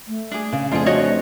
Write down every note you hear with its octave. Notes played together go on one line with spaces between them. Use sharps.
A3
D4 G#4
C#3 F5
F2 A3 D4 F4 G#4
F#4 C#5 D#5